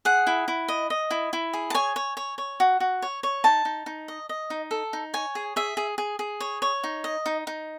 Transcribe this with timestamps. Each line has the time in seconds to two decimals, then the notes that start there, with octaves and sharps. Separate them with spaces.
0.05 G#4 F#5
0.27 E4
0.48 E4
0.68 D#5
0.90 D#5
1.11 E4
1.33 E4
1.53 G#4
1.70 A5
1.74 C#5 G#5
1.96 C#5
2.17 C#5
2.38 C#5
2.60 F#4
2.80 F#4
3.02 C#5
3.23 C#5
3.44 D#4 A5
3.65 D#4
3.86 D#4
4.08 D#5
4.29 D#5
4.50 D#4
4.71 A4
4.93 D#4
5.14 C#5 G#5
5.35 G#4
5.56 G#4 E5
5.77 G#4
5.98 G#4
6.19 G#4
6.40 C#5
6.62 C#5
6.84 D#4
7.04 D#5
7.26 D#4
7.47 D#4